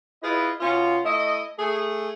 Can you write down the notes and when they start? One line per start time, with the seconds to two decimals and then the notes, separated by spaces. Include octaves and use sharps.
0.22 E4 F4 G#4 B4 D#5
0.60 B2 C#4 F4
1.04 A3 E4 D#5
1.59 A3 G#4